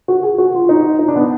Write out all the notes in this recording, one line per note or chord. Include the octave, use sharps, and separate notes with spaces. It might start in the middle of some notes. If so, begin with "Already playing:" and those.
F#4
G#4
F#4
F4
D#4
D#4
D4
B3